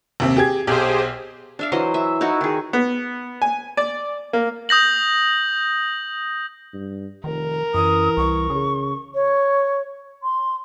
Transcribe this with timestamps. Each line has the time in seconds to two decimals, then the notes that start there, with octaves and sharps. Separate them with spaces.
0.20 D#2 C3 C4
0.37 G4 G#4 G#6
0.67 B1 G4 G#4 C5
1.59 D4 E5 F5
1.72 E3 F#3 C5 D#5
1.94 E5
2.21 D#4 E4 F#4
2.41 D#3 G#4
2.73 B3
3.42 G#5
3.77 D5
4.33 A#3
4.69 D#6 G6 A#6 F#7
6.74 G2
7.24 F1 D#3 A#4
7.74 F#2 E3 D#6
8.17 C2 C#6
8.50 C#3 G#4
9.14 C#5
10.23 C6